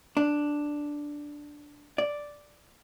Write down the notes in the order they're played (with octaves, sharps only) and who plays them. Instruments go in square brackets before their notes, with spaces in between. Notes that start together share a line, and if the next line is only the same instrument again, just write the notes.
[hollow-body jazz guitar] D4
D5